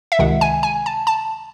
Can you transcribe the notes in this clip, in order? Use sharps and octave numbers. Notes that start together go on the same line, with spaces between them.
E5
C#2 C3 D#3 G#3 F#5
G#5
G#5
A5
A5